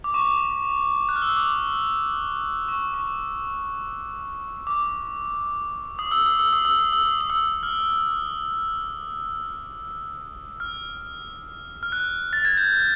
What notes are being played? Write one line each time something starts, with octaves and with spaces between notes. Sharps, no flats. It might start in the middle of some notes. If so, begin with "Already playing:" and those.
D6
C#6
D6
F#6
F6
E6
D#6
D6
C#6
C#6
D6
D#6
E6
D#6
E6
D#6
E6
D#6
E6
D#6
D#6
E6
F6
F6
F6
F#6
A6
G#6
G6